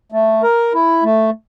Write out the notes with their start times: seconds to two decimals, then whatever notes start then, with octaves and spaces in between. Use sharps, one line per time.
0.12 A3
0.43 A#4
0.74 E4
1.03 A3